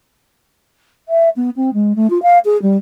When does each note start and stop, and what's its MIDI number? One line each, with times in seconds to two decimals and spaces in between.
1.08 1.29 76
1.36 1.50 59
1.56 1.70 60
1.74 1.95 56
1.96 2.09 57
2.10 2.21 65
2.22 2.38 77
2.45 2.60 68
2.62 2.77 55